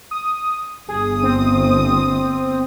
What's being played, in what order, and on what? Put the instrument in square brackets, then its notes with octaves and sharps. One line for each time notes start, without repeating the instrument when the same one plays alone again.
[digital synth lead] D#6
[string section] G1 D#6 [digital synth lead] G#4
[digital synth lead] C4